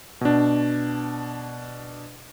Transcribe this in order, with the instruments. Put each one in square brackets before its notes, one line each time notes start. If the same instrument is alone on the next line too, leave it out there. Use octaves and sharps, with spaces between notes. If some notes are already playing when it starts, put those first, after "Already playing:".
[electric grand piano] B2 D4